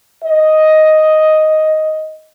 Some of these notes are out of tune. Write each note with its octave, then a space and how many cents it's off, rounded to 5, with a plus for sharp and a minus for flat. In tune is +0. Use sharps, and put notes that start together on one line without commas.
D#5 +5